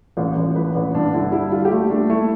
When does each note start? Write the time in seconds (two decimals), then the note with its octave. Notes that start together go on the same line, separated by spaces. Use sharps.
0.17 A1 F4
0.36 A1
0.55 F3 B4
0.75 A1
0.94 G2 D4
1.13 D3 E4
1.32 G3 E4
1.52 G3 F4
1.65 G4
1.71 A3 F4
1.90 A3 D4
2.10 A3 E4